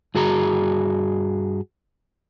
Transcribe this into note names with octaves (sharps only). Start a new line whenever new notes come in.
G2 F#4 G#4 A#5